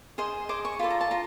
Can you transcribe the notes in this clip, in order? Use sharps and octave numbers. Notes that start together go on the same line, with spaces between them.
G#4 C5 D#5 C6
G#4 C5 D#5 D6
C#6
F4 A4 D5 B5
A#5
A5
F4 A#5